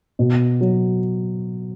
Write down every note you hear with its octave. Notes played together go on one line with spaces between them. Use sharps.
B2
F#3